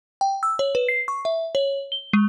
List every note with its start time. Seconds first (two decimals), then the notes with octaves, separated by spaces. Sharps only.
0.21 G5
0.43 E6
0.59 C#5
0.75 B4
0.89 C7
1.08 C#6
1.25 E5
1.55 C#5
1.92 G7
2.13 G#3